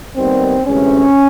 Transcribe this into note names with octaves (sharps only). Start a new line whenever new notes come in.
D#2 D#3 G3 B3 C4
D2 C3 E3 G#3 C#4